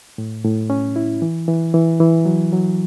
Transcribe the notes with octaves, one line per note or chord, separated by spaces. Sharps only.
A2
A2
C#4
E4
E3
E3
E3
E3
F#3
F#3